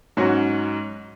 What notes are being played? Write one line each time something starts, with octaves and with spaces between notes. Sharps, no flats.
G#2 F#3 C#4 F#4